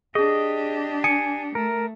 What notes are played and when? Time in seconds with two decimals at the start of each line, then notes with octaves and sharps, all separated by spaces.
0.15 D4 G4 G#4 D#5
1.04 G#5 D#6 C#7 D7
1.55 A3 A#4